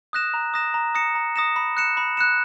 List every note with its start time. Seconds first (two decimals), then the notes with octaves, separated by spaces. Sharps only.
0.13 D#6 F#6 A#6 E7
0.34 A#5
0.54 D#6 F#6 A#6 E7
0.74 A#5
0.95 D#6 A#6 C#7 E7
1.15 A#5
1.36 D#6 A#6 C#7 E7
1.56 B5
1.77 F#6 C#7 E7
1.97 B5
2.17 F#6 C#7 E7